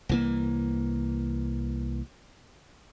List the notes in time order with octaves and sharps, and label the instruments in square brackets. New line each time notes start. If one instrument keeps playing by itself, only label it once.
[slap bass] C2 E3 A#3